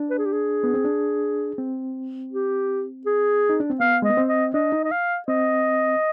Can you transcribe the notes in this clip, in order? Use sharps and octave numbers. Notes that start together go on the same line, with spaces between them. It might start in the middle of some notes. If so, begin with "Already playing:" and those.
Already playing: D4
B4
G#4
G4
G#4
B3
C4
D4
C4
G4
G#4
D#4
D4
C4
B3 F5
G#3 D#5
B3
C4
D#5
D4 D#5
D#4
D#5
F5
C4 D#5